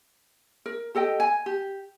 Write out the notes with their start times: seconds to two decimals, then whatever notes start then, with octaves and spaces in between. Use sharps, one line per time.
0.66 A#4
0.95 G4 A4 D#5 G5
1.20 G#5
1.46 G4